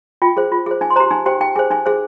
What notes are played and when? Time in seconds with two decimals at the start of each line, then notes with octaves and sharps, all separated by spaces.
0.22 F4 G5
0.37 G#4 C5
0.52 F4
0.66 G#4 C5
0.81 D#4 G#5
0.90 C6
0.96 C5 A#5
1.00 G4
1.11 D#4 G#5
1.26 G4 C5 G5
1.41 D#4 G5
1.55 G#4 C5 G#5
1.70 D#4 G#5
1.86 G#4 C5